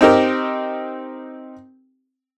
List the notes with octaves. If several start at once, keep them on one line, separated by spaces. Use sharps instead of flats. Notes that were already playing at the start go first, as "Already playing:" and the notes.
C4 D#4 G4 A#4